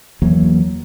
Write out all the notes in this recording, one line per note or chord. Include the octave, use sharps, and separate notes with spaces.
E2 E3 F#3 A#3